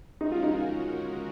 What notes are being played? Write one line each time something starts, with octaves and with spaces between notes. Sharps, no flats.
G#3 C#4 D#4 F#4 A#4
F4
D#4
F4